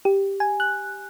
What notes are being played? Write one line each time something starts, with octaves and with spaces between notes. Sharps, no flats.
G4
G#5
F#6